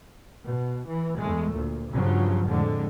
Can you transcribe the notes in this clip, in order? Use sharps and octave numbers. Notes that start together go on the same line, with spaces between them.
B2
E3
E2 G#3 A3
D2 A#2
G2 C#3 F3 F#3
F2 A2 D3 G#3